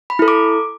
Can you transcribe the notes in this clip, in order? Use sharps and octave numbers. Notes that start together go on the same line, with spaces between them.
B5
E4 A4
D6